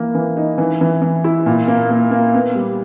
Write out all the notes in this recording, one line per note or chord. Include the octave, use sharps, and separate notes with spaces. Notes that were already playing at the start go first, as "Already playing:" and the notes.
Already playing: E3 A#3
E3
D#4
E3
E3
E3
E4
A#2
A#3
A#3
A#3
B3
G3